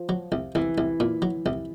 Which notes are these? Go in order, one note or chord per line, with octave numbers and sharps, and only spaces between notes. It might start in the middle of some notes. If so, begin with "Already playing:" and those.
Already playing: F3
F#3
C2
C2 E3
C2
A#2
F#3
C2